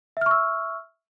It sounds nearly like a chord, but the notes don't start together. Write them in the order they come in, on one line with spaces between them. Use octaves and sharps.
E5 F6 C#6 E6